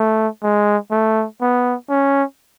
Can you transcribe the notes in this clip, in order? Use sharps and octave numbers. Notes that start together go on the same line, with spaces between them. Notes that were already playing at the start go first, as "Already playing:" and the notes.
Already playing: A3
G#3
A3
B3
C#4